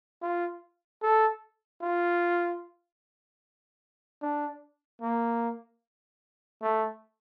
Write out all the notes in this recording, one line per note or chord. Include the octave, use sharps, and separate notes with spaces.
F4
A4
F4
D4
A#3
A3